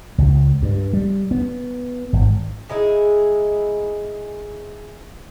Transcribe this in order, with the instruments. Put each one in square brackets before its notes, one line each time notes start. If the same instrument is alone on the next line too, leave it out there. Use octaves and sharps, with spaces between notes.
[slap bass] C#2
G2
G3
B3
G#1
[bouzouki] G#3 D#4 E4 G#4